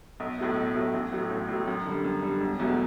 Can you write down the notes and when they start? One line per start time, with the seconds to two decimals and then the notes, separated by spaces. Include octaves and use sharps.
0.20 B1
0.38 A2 F#3 A3
0.57 B1
0.75 A2 F#3 A3
0.94 A1
1.12 A2 F#3
1.30 A1
1.49 A2 F#3
1.67 F#2
1.86 D3 G3
2.04 F#2
2.23 D3 G3
2.40 E1
2.60 E2 B2 F#3 A3